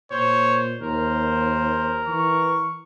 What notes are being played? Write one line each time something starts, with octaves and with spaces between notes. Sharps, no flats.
A#2 C5 C#5
D#2 A#4 C5
E3 C#6